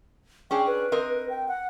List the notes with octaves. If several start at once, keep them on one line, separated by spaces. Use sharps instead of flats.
C#4 D4 G#4 G5
B4
C4 A#4 D#5
G5
F#5